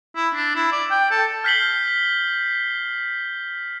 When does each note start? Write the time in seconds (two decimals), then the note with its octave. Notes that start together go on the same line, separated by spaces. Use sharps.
0.16 E4
0.34 D4
0.56 E4
0.72 D5
0.91 G5
1.11 A4
1.44 F6 G6 B6 C7 F#7 G7